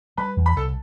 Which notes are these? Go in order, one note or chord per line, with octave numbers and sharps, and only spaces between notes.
G3 B4 B5
E2
B5
C2 A4 A5